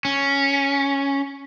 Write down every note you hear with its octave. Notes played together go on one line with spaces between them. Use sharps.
C#4